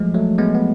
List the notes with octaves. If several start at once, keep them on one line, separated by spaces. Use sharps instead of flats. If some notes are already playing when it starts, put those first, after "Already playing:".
Already playing: F3 F#3 G#3 A3
F#3 A3
G#3 B3
B3